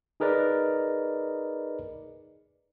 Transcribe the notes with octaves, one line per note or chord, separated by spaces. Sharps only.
D#4 G#4 A#4 B4 D5 D#5